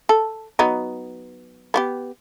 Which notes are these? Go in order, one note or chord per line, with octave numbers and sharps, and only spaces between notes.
A4
F#3 B3 D#4
B3 F#4 G4